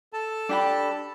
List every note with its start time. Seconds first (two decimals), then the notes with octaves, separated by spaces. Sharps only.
0.13 A4 A5
0.49 D4 G4 B5